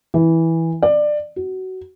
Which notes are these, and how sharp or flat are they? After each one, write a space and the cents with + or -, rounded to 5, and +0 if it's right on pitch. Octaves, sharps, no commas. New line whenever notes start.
E3 -10
D5 +20
F#4 +20